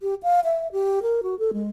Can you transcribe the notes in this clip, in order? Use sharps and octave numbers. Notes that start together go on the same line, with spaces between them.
G4
F5
E5
G4
A#4
F#4
A4
G#3